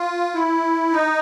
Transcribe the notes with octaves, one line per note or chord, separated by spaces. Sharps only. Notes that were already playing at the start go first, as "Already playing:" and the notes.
Already playing: F4
E4
D#4